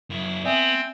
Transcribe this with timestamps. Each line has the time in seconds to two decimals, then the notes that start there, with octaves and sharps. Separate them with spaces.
0.10 F#2 E4
0.45 B3 C4 D5 E5 G#5